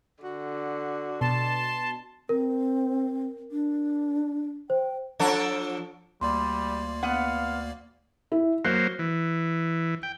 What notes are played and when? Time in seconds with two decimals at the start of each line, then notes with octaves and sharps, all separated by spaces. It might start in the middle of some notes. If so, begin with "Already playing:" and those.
0.24 D3 F#4
1.21 B2 A5 C6
2.29 C4 A#4
3.51 D4
4.70 C5 G5
5.19 F3 D4 A4
6.21 D2 G3 A#3 D5 C6
7.03 B3 F5 F#5
8.32 E4
8.65 F#3 A#3 C5 F#6
8.99 E3
10.03 G5